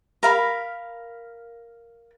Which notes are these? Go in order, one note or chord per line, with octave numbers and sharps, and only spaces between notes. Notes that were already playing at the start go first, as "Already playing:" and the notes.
A#4 F5 B5